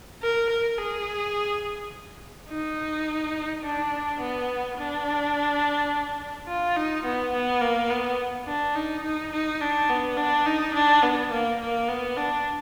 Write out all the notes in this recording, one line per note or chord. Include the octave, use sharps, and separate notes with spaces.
A#4
A#4
G#4
D#4
D4
B3
D4
F4
D#4
B3
B3
A#3
B3
D4
D#4
D#4
D#4
D4
B3
D4
D#4
D4
B3
A#3
A#3
B3
D4